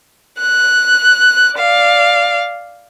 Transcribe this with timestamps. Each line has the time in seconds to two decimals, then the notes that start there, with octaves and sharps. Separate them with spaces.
0.40 F#6
1.55 D5 F5